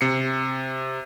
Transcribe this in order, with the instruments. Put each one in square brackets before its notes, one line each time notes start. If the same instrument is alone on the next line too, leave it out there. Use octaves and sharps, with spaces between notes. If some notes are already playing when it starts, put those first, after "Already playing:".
[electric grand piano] C3 C7 C#7